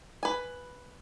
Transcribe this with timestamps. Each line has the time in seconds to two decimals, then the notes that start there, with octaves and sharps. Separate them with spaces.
0.23 B4 G#5